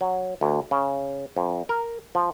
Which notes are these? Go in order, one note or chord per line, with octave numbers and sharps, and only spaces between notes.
F#3
D2
C#3
F2
A#4
F3